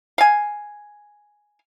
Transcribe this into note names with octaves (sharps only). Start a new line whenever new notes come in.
F5 G#5